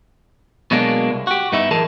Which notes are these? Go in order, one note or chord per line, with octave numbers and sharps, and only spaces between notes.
B2 F#3 G#3 A#3 D4
C2
F#4 G4
G2 B3 D#4 E4
F#2 A2 E3 G#4 A#4 A5